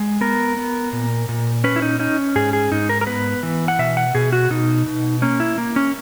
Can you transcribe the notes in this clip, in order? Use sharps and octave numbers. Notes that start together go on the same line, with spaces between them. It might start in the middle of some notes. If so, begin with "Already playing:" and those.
Already playing: G#3
B3 A#4
B3
A#2
A#2
C#4 B4
E4
D#4
C#4 D#4
G#2 G#4
G#4
G#2 D#4
A#4
A#4
B3 B4
E3
F#5
B2 E5
F#5
B2 G#4
F#4
B2 D#4
B2
A#3 C#4
E4
A#3
C#4